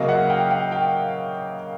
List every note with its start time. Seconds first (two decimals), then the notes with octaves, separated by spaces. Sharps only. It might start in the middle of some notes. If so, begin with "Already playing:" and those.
Already playing: C#3 F#3 A#3 D#5 F5
0.09 E5 F#5
0.30 F5 G5
0.51 F5 G5
0.71 F5 G5